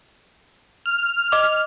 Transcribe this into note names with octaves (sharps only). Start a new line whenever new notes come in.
F6
D#5 D6